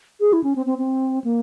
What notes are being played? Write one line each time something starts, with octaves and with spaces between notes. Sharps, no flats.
G#4
E4
C#4
C4
C4
C4
A#3